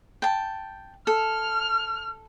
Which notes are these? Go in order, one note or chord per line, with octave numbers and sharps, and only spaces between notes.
G5 A5
A4 F6